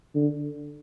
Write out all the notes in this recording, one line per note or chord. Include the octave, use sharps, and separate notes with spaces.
D3